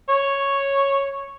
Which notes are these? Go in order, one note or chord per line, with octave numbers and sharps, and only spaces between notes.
C#5